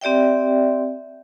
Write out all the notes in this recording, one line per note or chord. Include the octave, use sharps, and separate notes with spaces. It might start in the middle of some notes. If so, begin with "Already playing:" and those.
C4 G4 D5 E5 G5